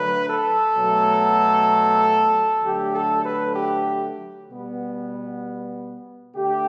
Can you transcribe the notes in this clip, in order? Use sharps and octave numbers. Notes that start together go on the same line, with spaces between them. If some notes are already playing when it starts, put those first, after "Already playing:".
Already playing: D3 F#3 A3 B4
A4
B2 F#3 A3
D3 F#3 A3 G4
A4
B4
G4
B2 G3 B3
D3 A3 G4